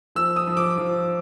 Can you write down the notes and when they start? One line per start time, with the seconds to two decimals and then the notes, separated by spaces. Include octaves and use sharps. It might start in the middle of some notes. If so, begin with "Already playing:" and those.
0.15 F3 E6
0.36 D#6
0.47 F3
0.57 D6
0.78 F3